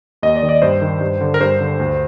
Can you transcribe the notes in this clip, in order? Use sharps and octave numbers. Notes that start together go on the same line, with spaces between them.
D#2 D#5
D5
D#3
D5
G2 C5
D#3
G2
D3
A#4
G2 C5
D3
D2